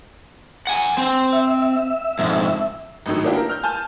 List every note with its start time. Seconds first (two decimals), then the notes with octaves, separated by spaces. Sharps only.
0.67 F#5 G#5
0.98 C4
1.33 E5
2.19 F2 G#2
3.06 G#1 A2 D#3 F#3
3.24 A#3 D4 E4 F#4 G4
3.37 A#4
3.49 F6 G6
3.64 G#5 A5 F6 G6